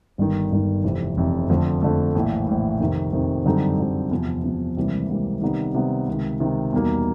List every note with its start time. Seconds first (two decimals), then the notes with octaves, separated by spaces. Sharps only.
0.18 G1 G2 D#3
0.52 G1 G2 D#3
0.84 F1 F2 C3 E3
1.16 F1 F2 C3 E3
1.49 F2 D3 F3 A3
1.82 F2 D3 F3 A3
2.15 A#1 A2 E3
2.47 A#1 A2 E3
2.80 F2 C3 D#3
3.13 F2 C3 D#3
3.46 F#2 D3 G3 C4 D#4
3.79 F#2 D3 G3 C4 D#4
4.11 E2 C3 F3
4.44 E2 C3 F3
4.77 C#2 C3 E3 G3 A#3
5.09 C#2 C3 E3 G3 A#3
5.41 C3 D#3 G3 B3 D#4
5.74 C3 D#3 G3 B3 D#4
6.08 C#2 C3 D#3
6.40 C#2 C3 D#3
6.73 E2 B2 G3 A#3 D#4